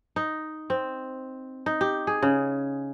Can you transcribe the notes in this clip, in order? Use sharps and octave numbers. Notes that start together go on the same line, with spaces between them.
D#4
C4
D#4
G4
G#4
C#3